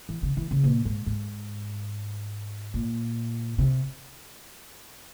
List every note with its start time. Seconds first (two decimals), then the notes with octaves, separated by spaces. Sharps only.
0.09 E3
0.23 C#3
0.37 E3
0.51 C#3
0.64 A#2
0.85 G#2
1.06 G#2
2.74 A#2
3.58 C3